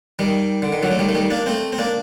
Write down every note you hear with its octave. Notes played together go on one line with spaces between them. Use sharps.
D#3 G3
D3
D#3
D3 F#3
A3
D#3 G3
A3
D#3 G3
A#3 D4
A3 C4
C4
A#3 D4